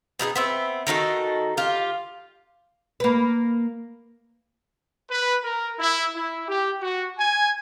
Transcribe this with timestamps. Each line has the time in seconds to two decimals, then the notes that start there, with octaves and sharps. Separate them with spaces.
0.19 B2 D#4 F#4 G#4
0.36 B3 C4 E5
0.87 D#3 D#4 F#4 A4
1.57 F4 G4
3.00 A#3 B4
5.11 B4
5.44 A#4
5.79 E4
6.15 E4
6.48 G4
6.82 F#4
7.18 G#5